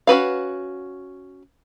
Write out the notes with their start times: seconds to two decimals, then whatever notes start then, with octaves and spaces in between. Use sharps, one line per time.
0.07 C#4 F#4 B4 F5